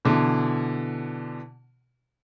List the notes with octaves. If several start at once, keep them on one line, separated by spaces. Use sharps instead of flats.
B2 D3 E3